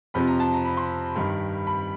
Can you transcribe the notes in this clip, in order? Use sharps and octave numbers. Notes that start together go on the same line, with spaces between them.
F2 C3 F3 B5
A#5
A5
A#5
B5
C6
G2 D#3 B5
B5